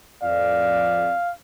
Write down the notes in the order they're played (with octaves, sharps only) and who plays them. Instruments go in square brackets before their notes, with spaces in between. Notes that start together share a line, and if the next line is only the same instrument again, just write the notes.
[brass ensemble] F2 D5 [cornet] F5